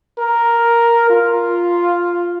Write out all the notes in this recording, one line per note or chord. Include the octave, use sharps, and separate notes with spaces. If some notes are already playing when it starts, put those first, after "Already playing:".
A#4
F4